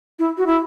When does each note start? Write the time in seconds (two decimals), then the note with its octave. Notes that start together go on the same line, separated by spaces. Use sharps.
0.19 E4
0.38 F#4
0.46 E4